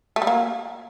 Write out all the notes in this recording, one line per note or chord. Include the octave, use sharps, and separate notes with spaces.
A3
G3
A#3